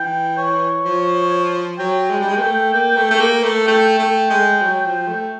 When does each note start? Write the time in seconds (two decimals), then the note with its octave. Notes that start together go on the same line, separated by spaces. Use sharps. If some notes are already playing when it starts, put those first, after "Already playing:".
Already playing: E3 G5
0.38 C#5
0.85 F3
1.79 F#3 G5
2.11 G#3
2.20 G3
2.29 G#3
2.37 A#3
2.42 A3
2.73 A#3
2.97 A3
3.11 A3
3.20 A#3
3.43 A3
3.67 A3 G5
3.99 A3
4.30 G#3
4.62 F#3
4.85 F3
5.08 A3